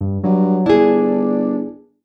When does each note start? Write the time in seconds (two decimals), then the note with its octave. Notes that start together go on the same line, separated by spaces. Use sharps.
0.01 G2
0.24 G2 F#3
0.66 G1 D4 E4 G#4